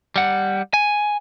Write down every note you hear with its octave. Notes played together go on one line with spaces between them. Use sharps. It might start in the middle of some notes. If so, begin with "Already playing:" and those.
G3 F#5
G#5